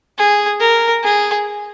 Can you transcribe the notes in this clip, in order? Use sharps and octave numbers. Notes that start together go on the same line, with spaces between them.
G#4
A#4
G#4